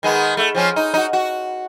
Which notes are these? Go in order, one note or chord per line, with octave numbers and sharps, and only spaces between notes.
D#3 G#3 B3
A3
F3 C4 C#4
D#4
D#4 F#4
F#4